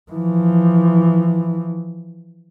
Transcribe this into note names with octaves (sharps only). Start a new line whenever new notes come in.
E3 F3